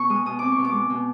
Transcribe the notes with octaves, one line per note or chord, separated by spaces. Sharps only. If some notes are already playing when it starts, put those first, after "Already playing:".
Already playing: B2 C#6
G#3 D#6
B2 D#6
C4 D6
C#6
B2
D6
G#3
B2